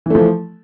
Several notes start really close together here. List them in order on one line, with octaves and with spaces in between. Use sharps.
E3 A3 F3